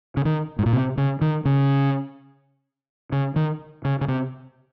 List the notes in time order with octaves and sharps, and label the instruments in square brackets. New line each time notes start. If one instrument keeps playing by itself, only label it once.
[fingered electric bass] C#3
D#3
G#2
A#2
C3
C#3
D#3
C#3
C#3
D#3
C#3
C#3
C3